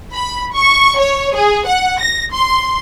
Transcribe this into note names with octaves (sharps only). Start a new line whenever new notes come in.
B5
C#6
C#5
G#4
F#5
A#6
C6